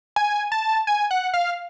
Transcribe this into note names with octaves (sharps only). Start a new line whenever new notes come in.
G#5
A5
G#5
F#5
F5